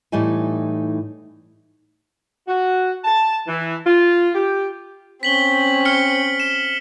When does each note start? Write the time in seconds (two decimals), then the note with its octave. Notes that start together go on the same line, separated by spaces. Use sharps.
0.12 A2 E3 G3 D#4 G4 G#5
2.48 F#4
3.04 A5
3.47 E3
3.86 F4
4.34 G4
5.23 C4 C#4 B6 F#7 G7
5.85 F6 C#7 G7
6.40 E7